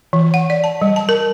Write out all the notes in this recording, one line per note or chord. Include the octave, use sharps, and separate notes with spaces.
E3
F#5
D5
A5
G3
A5
A#4